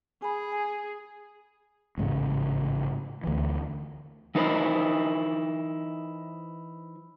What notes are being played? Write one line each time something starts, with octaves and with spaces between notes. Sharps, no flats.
G#4 G#5 B5
G#5
A1 G#2 C#3
D2 E3
E3 D#4 E4 A#4 C5